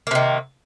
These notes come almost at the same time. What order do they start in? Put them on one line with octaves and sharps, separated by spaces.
A#3 C3 D#3